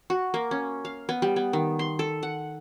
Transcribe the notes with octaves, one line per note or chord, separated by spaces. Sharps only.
F#4
A#3
C#4
F5
B3
G3
B3
D#3
C6
A4
F#5